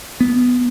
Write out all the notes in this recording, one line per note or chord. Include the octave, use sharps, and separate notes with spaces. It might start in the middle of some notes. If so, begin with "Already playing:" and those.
B3